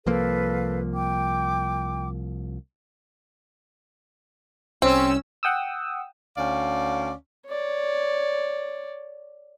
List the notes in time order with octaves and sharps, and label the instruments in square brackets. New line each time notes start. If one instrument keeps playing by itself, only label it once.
[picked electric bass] C2 F3 A#3 [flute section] A4 B4 F5
[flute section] G5 D6
[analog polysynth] C2 C#4 E6 [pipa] C4
[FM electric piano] F#5 G5 D#6 E6
[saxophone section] D2 C#4 D5 F5
[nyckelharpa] C#5 D5